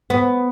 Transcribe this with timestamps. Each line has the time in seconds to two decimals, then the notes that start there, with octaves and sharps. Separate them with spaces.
0.10 B3